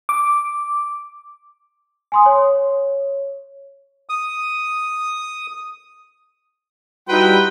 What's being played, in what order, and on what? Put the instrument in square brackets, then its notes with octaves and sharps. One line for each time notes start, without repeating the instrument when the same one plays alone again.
[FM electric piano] D6
[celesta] G#5 C6 D#6
C#5
[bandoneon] D#6
[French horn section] G3 F#4 [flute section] D#4 E4 C6 [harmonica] B4 G5 B5